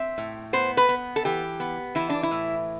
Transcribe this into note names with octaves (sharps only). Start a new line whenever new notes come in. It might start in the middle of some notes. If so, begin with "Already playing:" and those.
Already playing: C4 E5
A2
B3 C5
B4
B3
A4
E3 G4
B3
E3 E4
D4
E4
A2